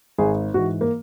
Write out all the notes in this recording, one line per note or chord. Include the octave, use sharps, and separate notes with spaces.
G#1 G#4
G#2 E3 F#4
A#3